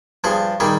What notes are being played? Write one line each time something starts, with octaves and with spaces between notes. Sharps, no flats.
G2 F3 G#4
D#3 G3 G#4